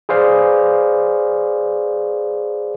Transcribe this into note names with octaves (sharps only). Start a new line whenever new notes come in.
G#4 B4 C5 D5 F5